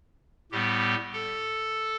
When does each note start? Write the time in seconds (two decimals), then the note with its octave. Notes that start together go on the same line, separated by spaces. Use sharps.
0.51 A2 G3 B3 G4
1.13 A4